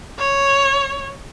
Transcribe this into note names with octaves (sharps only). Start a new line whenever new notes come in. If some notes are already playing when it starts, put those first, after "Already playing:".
C#5